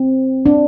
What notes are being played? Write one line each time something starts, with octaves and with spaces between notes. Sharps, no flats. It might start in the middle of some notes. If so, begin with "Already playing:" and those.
Already playing: C4
D4